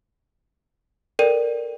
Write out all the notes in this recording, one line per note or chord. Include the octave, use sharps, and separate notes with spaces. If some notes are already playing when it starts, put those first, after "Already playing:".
A4 A#4 D5 G5 D#7